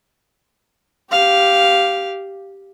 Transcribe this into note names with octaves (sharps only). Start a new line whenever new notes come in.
G4 F5